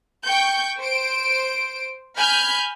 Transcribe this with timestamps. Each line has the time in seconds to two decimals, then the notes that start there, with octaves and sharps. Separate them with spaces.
0.24 G5 C#6 G6
0.79 C5 D7
2.16 G#5 B5 F6 G6